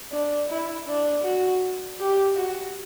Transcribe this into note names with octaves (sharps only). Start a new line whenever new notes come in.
D4
E4
D4
F#4
G4
F#4